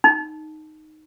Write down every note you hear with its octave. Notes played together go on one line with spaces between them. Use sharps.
D#4